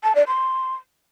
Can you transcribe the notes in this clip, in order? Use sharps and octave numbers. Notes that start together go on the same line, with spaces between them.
A5
D5
C6